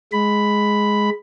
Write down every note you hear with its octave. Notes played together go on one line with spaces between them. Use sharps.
G#3 B5